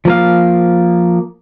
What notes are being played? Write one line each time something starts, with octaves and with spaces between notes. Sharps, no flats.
F3 A#3 F5